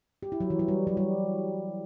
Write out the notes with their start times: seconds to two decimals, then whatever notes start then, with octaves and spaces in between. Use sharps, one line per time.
0.23 G4
0.32 E4
0.40 F#3
0.50 E3
0.59 F#3
0.68 G3
0.87 F#3
0.97 G3